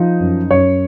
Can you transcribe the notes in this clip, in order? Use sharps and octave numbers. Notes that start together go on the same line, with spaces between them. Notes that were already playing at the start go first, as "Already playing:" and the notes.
Already playing: F3 D#4
F#2
F#2 C#5